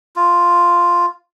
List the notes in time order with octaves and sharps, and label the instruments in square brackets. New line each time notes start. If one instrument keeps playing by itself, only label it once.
[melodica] F4